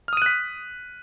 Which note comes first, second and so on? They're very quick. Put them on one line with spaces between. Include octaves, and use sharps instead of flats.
F6 D#6 D#7 F#6 B6